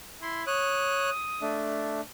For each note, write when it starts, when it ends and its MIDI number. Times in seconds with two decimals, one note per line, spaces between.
0.22 0.46 64
0.22 0.42 84
0.47 1.10 73
0.47 1.68 87
0.47 1.10 90
1.42 2.01 57
1.42 2.01 62